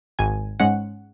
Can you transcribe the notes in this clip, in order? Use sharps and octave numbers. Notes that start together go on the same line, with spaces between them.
G#1 G#5
G#2 G#3 C#4 F#5